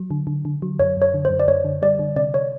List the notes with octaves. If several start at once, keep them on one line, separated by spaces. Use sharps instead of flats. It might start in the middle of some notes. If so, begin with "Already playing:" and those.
Already playing: F#3
D3
D3
D3
F#3
F#2 C#5
F#2
C#5
D3
C5
F#2
D5
F#2 C#5
D3
G3 D5
D3
C3 D5
C#5